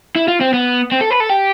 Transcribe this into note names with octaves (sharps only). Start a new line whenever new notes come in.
E4
F4
C4
B3
C4
A4
B4
A4
G4